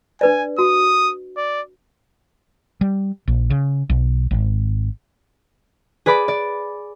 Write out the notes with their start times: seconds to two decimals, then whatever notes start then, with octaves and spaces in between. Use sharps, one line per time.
0.21 D4 B4 D5 G#5
0.58 F#4 D#6
1.37 D5
2.81 G3
3.28 A#1
3.50 C#3
3.90 B1
4.31 G#1
6.06 G#4 B4 D5 B5 D6
6.28 D5